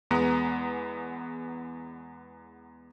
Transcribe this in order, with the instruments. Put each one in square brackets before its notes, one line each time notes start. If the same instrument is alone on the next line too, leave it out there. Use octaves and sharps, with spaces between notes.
[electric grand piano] E2 G#3 B3 A#5 D#6